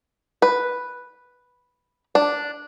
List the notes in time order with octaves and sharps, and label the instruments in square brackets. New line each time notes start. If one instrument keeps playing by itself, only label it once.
[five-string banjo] B4
D4